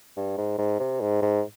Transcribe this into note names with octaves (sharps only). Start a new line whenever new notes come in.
G2
G#2
G#2
C3
G#2
G#2